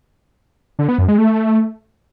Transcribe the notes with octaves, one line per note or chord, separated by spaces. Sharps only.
D3
B3
F#2
G#3
A3